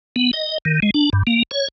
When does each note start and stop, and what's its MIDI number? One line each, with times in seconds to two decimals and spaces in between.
0.16 0.31 59
0.33 0.58 75
0.65 0.80 51
0.82 0.91 56
0.94 1.10 62
1.13 1.23 43
1.27 1.43 58
1.51 1.68 73